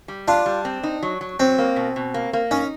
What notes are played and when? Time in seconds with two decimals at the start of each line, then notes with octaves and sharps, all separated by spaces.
0.08 G3
0.28 D4 F4
0.46 G3
0.65 C4
0.83 D#4
1.03 F#3
1.21 F#3
1.39 F#3 C4
1.58 A#3
1.76 B2
1.96 B2
2.14 A#3
2.33 A#3
2.51 C#4 D#4